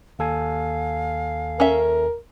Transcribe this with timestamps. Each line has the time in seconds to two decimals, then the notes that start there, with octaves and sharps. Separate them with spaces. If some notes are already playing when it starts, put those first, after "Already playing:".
0.19 D#2 A4 F5 G#5
1.60 C#4 A#4 E5